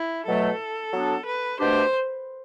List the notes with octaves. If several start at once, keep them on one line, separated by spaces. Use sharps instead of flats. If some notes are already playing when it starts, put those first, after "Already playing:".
Already playing: E4
B2 F#3 A3 A4
F#3 B3 D4
B4
B2 A3 D4 G4 C5